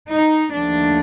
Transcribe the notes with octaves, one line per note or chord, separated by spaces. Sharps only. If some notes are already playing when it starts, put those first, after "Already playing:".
D#4
D#2 D3 F3 A3 D4